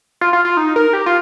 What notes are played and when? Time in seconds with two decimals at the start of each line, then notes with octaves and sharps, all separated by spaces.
0.21 F4
0.33 F4
0.45 F4
0.57 D#4
0.76 A#4
0.93 G4
1.06 F4